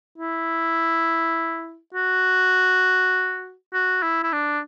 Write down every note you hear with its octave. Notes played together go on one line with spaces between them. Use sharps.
E4
F#4
F#4
E4
E4
D4